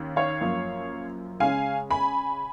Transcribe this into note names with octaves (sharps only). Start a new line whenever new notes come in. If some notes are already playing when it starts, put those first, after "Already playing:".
Already playing: D#2 C#4
C#5 F5
F#2 F3 A#3
C#3 G#3 C#4 F5 G#5
G#5 B5